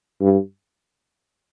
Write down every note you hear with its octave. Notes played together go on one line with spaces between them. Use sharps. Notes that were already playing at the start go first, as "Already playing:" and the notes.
G2